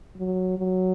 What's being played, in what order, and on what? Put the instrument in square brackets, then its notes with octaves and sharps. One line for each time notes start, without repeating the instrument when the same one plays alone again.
[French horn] F#3
F#3